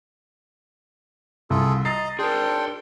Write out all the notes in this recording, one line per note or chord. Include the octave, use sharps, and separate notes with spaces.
C2 F4 G#4 A4
D#5 A#5 A6 C7
D4 G#4 A#4 G5 C6